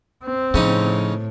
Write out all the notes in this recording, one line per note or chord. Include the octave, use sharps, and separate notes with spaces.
C4
A2 C#3 F3 C#4 D#4